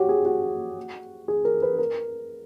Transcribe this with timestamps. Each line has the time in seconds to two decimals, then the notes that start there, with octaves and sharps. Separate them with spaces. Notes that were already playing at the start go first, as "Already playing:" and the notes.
Already playing: F#4 G4 C#5
0.09 G#4
0.25 F#4
1.28 G#4
1.45 A#4
1.62 B4
1.78 A#4